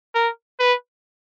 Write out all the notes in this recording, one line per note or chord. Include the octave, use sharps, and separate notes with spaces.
A#4
B4